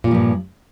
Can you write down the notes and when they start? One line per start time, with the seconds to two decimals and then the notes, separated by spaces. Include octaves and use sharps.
0.04 A#2
0.08 G3
0.11 F3
0.15 G2